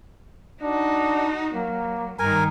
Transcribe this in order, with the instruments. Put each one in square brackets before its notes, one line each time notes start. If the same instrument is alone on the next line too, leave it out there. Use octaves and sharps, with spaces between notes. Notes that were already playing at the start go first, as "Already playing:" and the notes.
[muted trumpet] D4 [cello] D#4 F#4
[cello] F#3 [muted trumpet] A#3
[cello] G2 D#3 [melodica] A#4 G#5 [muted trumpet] A#5